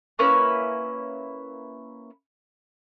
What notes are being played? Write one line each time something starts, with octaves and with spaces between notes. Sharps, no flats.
A#3 C#4 E4 B4